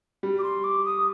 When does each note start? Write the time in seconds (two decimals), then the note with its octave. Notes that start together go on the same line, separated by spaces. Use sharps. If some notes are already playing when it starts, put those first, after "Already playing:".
0.23 G3
0.39 D6
0.43 C6
0.64 D6
0.85 D#6